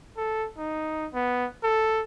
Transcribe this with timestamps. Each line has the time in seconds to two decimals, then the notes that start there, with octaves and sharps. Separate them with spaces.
0.17 A4
0.58 D#4
1.14 B3
1.64 A4